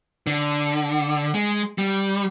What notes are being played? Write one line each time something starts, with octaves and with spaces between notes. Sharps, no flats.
D3
G#3
G3